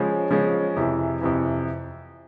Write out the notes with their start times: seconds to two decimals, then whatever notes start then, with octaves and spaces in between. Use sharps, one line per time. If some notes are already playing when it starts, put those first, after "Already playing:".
Already playing: C#3 F3 G#3 C#4
0.30 C#3 F3 G#3 C#4
0.76 F2 C3 E3
1.21 F2 C3 E3